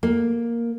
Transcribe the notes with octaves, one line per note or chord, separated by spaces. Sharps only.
A#3